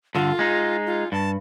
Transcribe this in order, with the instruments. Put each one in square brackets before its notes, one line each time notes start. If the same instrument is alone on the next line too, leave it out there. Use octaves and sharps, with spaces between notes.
[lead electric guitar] G2 D3 [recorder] F4
[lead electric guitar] G#3 D#4
[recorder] F4
[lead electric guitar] G2 [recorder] A5